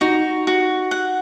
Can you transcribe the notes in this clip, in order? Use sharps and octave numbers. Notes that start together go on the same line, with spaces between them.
D#4 F#4
F#4
F#5